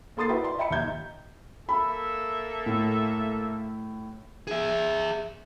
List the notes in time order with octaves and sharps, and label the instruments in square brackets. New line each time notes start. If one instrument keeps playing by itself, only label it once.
[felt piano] A#3 A4 C6 D#6 A6 C7
E4 F#4 B4 E5 G5 B5
D5 C6
D#5 E5 G5 B5 C#7
D#2 D#4 E5 G6 G#6
[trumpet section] A#3 A4 E5 [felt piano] B5
[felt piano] A2
[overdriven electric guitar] G#4 E5